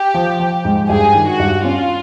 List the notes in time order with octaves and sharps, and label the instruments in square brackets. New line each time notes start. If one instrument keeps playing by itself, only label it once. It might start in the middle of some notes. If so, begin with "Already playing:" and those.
Already playing: [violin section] G4
[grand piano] F3
F3
G#2
[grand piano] G2 [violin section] G#4
[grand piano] D#3
[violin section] F#4
[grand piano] G2
[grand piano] C#4 [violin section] F4